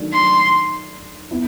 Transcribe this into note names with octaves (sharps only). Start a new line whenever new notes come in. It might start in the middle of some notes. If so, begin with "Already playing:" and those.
Already playing: D#3 F#3 A3 D4
C6
B3 E4